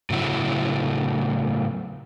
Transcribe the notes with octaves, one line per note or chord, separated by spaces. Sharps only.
A2 C#3 F#3 A3 E4